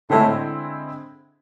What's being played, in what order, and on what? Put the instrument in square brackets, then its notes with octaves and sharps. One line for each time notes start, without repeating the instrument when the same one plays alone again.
[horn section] A2 [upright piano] D3 G#3 C4 E4